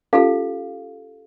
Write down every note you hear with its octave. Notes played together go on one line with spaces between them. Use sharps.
C#4 F4 G4 A4 F5